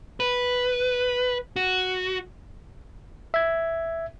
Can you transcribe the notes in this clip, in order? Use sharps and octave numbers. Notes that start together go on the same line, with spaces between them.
B4
F#4
E5 G#6